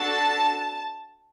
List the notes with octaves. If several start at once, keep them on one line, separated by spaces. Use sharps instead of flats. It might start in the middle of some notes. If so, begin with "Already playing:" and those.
Already playing: D4 F#4 A4 A5